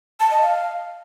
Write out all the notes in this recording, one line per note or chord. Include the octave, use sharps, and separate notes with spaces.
A5
D#5
F5